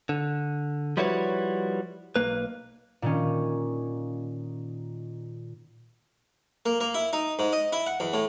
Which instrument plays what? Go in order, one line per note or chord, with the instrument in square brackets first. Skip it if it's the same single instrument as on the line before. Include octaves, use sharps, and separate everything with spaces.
[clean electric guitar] D3
F3 G3 E4 F#4 B4 C#5
B1 A#3 B4
[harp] A#2 D#3 C#4
[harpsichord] A#3
A#3
E4
D#4
G#2
D#5
E4
F#5
E2
A2